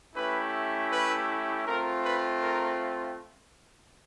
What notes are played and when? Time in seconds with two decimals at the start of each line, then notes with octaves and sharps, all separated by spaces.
0.15 A3 C#4 E4 G4 B4
0.91 B4
1.66 A3 C4 F4 A#4
2.05 B4
2.42 A#4